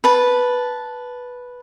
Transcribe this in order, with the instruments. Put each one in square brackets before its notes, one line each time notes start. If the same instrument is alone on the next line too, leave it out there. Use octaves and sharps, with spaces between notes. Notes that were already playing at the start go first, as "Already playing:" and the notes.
[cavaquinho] B4 A5